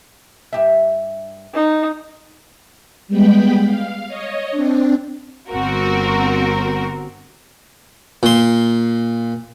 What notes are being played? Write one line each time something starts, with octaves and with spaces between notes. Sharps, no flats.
G2 G4 E5
D#4
G3 G#3 B3 G5 B5
F5
C#5 D#5
C4 D4
G1 C4 F#4 A#4
A#2 C6